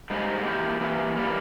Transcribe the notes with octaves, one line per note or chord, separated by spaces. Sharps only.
G#2 G3 A#3 D#4
E3 A#3 E4 G4
E3 A#3 E4 G4
E3 G3 A#3